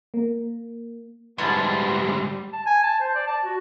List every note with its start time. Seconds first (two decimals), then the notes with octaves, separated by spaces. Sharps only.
0.14 A#3
1.38 D2 G#2 G3 B3 E4 A5
2.53 A5
2.66 G#5
2.83 A5
3.00 C5
3.15 D5
3.27 A5
3.45 F#4